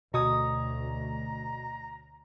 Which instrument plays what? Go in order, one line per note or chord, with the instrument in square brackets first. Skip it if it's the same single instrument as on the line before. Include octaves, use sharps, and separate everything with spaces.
[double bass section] D2 [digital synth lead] B2 [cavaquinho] C#5 D#6 [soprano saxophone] A#5